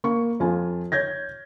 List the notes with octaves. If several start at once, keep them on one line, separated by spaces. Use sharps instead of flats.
A#3 C#6
F2 F4 G#5
C#5 G6 G#6 A#6